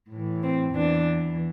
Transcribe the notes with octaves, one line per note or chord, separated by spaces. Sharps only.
A2 E3
C4
E2 E3 D4